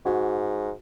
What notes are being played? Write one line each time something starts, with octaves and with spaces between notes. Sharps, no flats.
G#2 F#4